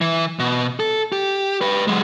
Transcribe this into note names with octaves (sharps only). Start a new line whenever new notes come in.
E3
B2
A4
G4
G4 B4
F#3 G#3